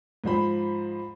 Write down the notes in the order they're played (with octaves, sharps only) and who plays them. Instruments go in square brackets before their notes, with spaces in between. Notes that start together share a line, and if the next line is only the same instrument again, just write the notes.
[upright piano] G#2 F3 C5 B5